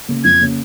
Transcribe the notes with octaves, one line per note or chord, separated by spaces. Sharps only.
C#3 A#3 C#4
F2 G#6
C#3 A#3 C#4